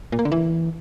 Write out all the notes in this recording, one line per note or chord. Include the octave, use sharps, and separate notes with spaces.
A#2
A#3
D3
E3